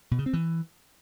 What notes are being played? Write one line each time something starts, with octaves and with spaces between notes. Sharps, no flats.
B2
C#3
C4
E3